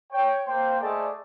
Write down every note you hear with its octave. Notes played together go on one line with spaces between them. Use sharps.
C#5 G5
A#3 C5 G5
A3 G#4 C5 D5 D#5 A5